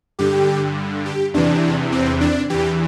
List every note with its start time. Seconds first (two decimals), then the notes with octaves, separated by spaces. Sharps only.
0.19 G2 D3 G4
1.05 G4
1.34 E2 C3 E3 D4
1.92 C4
2.21 D4
2.50 E2 E3 G4